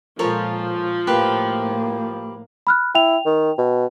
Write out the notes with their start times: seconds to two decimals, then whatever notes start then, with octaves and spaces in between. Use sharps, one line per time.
0.19 A#2 F3 G#3 A4 A#4 C#5
1.07 A2 A#3 G4 A#4 B4
2.67 B5 F6 F#6
2.95 E4 G5 F7
3.26 D#3
3.58 B2